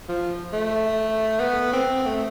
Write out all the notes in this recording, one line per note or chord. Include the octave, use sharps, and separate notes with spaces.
F3
A3
B3
C4
A3